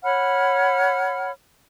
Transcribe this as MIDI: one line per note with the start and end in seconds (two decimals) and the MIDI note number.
0.04 1.30 73
0.04 1.30 78
0.04 1.30 83
0.04 1.30 89